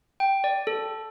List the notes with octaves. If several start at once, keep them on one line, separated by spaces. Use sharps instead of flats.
G5
D5
A4